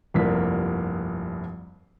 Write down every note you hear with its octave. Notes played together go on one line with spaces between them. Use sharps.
F1 C2 G2 F3 A#3 B6